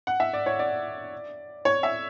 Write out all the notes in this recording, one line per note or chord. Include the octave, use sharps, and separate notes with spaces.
F#5
E5
D5
C#5
D5
C#5
E5